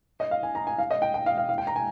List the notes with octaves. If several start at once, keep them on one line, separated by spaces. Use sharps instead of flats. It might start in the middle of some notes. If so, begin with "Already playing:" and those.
D#5
F5
G#5
A#5
G#5
F5
D#5
G5
G5
F5
F5
F5
G5
A#5
G#5